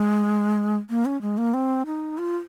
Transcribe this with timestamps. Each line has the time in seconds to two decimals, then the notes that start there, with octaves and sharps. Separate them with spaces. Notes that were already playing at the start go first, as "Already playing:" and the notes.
Already playing: G#3
0.90 A#3
1.05 C#4
1.22 G#3
1.38 A#3
1.54 C4
1.86 D#4
2.18 F4